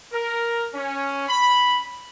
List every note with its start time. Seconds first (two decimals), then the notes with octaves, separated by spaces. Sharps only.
0.12 A#4
0.73 C#4
1.29 B5